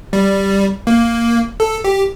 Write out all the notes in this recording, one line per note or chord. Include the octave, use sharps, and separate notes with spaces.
G3
A#3
A4
G4